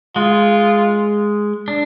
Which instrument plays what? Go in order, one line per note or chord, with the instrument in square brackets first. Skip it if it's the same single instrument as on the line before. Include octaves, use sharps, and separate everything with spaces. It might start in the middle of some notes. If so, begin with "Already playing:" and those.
[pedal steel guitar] G#3 [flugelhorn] F4
[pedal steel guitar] D4